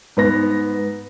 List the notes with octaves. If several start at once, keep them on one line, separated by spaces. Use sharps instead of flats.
G#2 B3 A#6